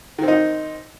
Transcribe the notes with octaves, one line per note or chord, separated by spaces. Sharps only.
D#3 C4 D#4